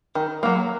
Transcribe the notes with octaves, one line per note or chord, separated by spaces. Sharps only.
D#3
F#3 A#3